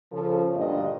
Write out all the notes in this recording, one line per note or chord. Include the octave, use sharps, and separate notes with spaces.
C#3 F3 A4
D2 G2 A#2 D3 A#3 D#5